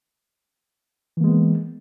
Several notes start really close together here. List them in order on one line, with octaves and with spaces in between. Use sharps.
E3 A#3 G#3 B3